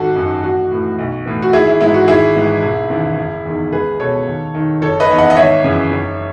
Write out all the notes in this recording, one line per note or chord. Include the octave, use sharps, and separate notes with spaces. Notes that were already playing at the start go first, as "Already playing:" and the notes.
Already playing: G#1 F#4 A4
F#2 D#3
A1 F#4
A2 E3
B1
A2 E3
F#4
G#1 E4 G#4
E4
G#2 E3 E4
F#4
G#1 E4 G#4
G#2 E3
E1
D#2 C#3 E3
F#1
E2 D#3
C#2 G#4 B4
B2 A4 C#5
D#2
D#3
F#1 A4 C#5
B4 D#5
E2 D#3
D#5 F#5
D#5
G#1 C#5 E5
F#2 C#3 E3
F#1